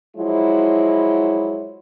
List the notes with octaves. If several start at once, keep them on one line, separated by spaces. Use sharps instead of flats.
F3 F#3 G#3 E4